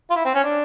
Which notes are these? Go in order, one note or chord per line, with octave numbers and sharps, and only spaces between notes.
F4
E4
C4
C#4
D4